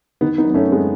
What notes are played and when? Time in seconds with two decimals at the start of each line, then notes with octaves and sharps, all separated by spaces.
0.21 D#3 B3 D#4
0.38 B3 D#4
0.44 F#2
0.50 B3
0.54 A3 C#4
0.66 F#2
0.72 G#3 B3